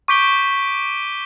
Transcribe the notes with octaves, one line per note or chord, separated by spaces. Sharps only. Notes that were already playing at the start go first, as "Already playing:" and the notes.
C#6 D6 G6 B6 D7 G7